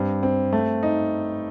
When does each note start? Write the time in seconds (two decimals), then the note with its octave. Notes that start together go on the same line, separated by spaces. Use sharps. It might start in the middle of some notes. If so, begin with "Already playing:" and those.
Already playing: G2 C4
0.23 C4
0.53 A3
0.83 D#4